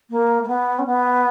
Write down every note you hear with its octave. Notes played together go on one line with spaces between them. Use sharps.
A#3
A#3
B3
C#4
B3